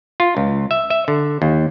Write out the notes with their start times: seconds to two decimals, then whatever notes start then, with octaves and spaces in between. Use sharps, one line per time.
0.20 F4
0.37 C#2
0.71 E5
0.90 E5
1.08 D3
1.42 D#2